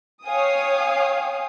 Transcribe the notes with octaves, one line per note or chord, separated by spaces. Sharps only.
C#5 F5 G5 G#5 D#6